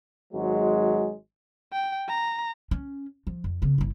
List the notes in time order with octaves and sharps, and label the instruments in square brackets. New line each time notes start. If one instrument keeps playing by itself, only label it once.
[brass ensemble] G#1 F#3 G#3
[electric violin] G5
A#5
[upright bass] C#4
F3
F2
C#3 B3
G1 E4